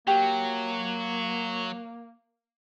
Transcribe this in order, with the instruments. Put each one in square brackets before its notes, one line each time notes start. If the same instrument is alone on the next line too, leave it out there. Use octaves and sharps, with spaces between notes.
[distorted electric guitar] F#3 [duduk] A#3 [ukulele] G4